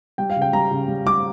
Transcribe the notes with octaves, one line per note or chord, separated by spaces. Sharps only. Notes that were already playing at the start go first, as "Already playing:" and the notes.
G3 G5
F5
C#3
G5
G3 A#5
C#3
G3
G3 D6